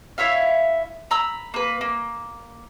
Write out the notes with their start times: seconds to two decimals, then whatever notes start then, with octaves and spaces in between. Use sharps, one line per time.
0.18 E4 C#5 E5 F5
1.11 A#5 B5 E6
1.54 A#3 B4
1.81 A#3